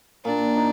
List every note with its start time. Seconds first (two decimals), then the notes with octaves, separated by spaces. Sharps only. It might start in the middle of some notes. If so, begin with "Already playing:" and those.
0.25 A#2 D4
0.56 D#4